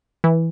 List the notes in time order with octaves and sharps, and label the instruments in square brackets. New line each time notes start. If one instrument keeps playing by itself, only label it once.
[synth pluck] E3